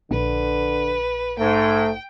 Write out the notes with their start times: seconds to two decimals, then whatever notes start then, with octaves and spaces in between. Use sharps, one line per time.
0.11 A#1 D3 B4
1.38 G#2 A3 G5